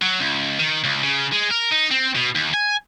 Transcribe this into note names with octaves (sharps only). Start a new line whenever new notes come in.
F#3
C#2
D#3
C#2
C#3
G#3
A#4
D#4
C4
B2
D#2
G#5